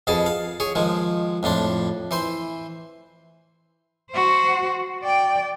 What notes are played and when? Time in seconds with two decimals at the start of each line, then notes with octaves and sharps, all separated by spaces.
0.07 F2 B2 G#4 A5
0.26 F5
0.60 G#4 C#5
0.75 D#3 F3 G#3
1.43 F2 A2 D4 C6
2.11 E3 C5 C6
4.11 F#4 C5
5.03 D5 G5